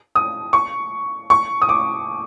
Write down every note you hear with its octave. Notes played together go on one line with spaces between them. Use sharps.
D#6
C#6
C#6
D#6
D6